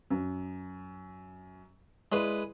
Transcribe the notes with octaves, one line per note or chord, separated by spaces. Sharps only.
F#2
G#3 E4 B4 D5 C6